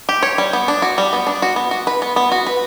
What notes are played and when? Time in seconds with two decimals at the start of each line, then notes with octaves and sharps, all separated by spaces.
0.09 G4
0.23 C#5
0.38 G3
0.53 B3
0.68 D4
0.82 F#4
0.98 G3
1.13 B3
1.27 D4
1.42 F#4
1.56 B3
1.71 F#4
1.87 B4
2.02 B3
2.16 B3
2.32 F#4
2.46 B4